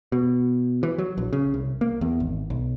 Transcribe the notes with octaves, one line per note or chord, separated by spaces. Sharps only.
B2
E3
F#3
A#1
C#3
C2
A#3
E2
G#1
B1